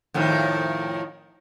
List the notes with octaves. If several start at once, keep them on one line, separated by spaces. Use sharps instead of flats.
F2 A2 D#3